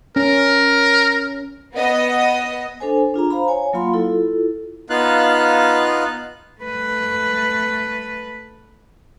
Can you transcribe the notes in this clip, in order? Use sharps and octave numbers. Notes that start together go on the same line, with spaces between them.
C#4 A#4
B3 D#5
D4 A4 C5 G#5
D4 F4 G#4 A#5
C5 F5 A#5 B5
C#5 G#5
F#3 A#3 F4 F5 B5 C6
E4 F4 A4
B3 D#4 F4 F5 F#6
A3 B4